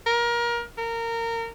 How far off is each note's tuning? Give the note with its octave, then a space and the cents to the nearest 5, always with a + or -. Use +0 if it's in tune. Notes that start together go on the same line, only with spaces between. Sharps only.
A#4 +25
A#4 -20